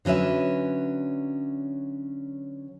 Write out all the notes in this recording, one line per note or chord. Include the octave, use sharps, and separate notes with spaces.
D3 F#3 C#4 B4 E5